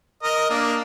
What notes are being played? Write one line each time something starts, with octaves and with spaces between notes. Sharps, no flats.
A#4 D#5
A#3 D4